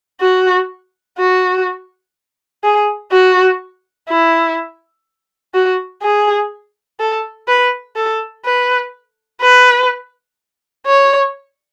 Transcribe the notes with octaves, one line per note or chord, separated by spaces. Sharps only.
F#4
F#4
G#4
F#4
E4
F#4
G#4
A4
B4
A4
B4
B4
C#5